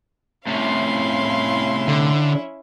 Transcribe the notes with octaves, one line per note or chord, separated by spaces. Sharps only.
A2 C3 C#4 E4 F5 C6
D3